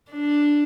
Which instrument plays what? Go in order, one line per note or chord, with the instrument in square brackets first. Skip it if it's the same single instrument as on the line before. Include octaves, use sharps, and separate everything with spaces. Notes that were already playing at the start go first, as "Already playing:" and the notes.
[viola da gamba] D4